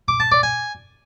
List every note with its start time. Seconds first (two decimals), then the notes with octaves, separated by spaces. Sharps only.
0.08 D6
0.20 A5
0.32 D5
0.43 G#5